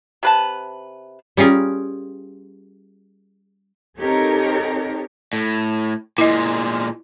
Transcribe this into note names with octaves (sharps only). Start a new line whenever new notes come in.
C3 B4 A5
G3 C#4 F4 G#4 A#4
C4 D#4 G4 A4 A#4 C#5
A2
A#2 G#3 E4 D#5